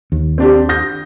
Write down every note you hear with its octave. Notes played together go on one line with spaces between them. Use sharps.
D#2
C4 D4 G4
D#6 G6 A#6